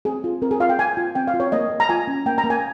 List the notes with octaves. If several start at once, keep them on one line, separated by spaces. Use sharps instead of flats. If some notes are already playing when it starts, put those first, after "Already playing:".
C4 G#4
F4
C4 A#4
G#4
F4 F5
G5
C4 G#5
F4
C4 G5
F5
F4
C#5
A#3 D#5
A#3
A#5
F4 G#5
C#4
A#3 G5
A#5
A#3
G#5